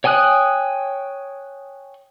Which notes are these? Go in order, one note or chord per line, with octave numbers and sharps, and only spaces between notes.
C#5 G5 G#5 D#6 F#6